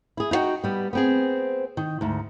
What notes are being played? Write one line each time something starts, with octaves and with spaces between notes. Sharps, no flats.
E4 G#4
D#4 E4 F#4 G5
G3 B3
B3 C4 G#4
D#3
D2 G#2